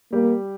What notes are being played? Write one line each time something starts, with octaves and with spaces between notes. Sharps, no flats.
G3 A#3 G4